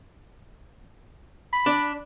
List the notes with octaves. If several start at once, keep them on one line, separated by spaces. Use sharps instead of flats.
B5
D4